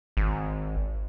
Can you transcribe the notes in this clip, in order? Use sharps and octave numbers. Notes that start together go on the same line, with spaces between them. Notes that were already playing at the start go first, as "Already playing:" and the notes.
G#1